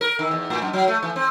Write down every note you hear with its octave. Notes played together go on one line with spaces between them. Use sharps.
A#4
D#3
E2
A2
F#2
F#3
A3
E3
C4